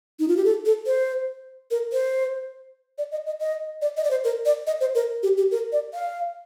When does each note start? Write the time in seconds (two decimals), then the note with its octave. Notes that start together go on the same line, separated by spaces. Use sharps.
0.20 D#4
0.28 F4
0.37 G4
0.45 A4
0.66 A4
0.86 C5
1.71 A#4
1.92 C5
2.98 D5
3.12 D#5
3.26 D#5
3.40 D#5
3.82 D5
3.97 D#5
4.04 D5
4.11 C5
4.24 A#4
4.46 D5
4.67 D#5
4.81 C5
4.95 A#4
5.23 G4
5.38 G4
5.51 A#4
5.72 D5
5.94 F5